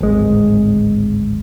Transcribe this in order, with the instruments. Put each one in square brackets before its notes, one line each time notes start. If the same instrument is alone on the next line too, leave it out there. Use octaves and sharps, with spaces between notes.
[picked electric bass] D1 G#1 G#3